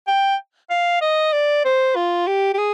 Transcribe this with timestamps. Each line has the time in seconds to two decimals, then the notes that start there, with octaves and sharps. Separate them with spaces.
0.07 G5
0.70 F5
1.01 D#5
1.33 D5
1.65 C5
1.96 F4
2.27 G4
2.54 G4
2.58 G#4